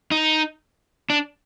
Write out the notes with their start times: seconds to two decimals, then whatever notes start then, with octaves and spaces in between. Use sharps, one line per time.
0.11 D#4
1.10 D4